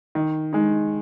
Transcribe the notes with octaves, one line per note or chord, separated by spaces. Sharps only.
D#3
G#3 D#4